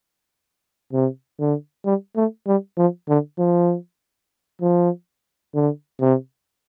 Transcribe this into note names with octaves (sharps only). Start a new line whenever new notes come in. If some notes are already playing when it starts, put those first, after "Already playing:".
C3
D3
G3
A3
G3
F3
D3
F3
F3
D3
C3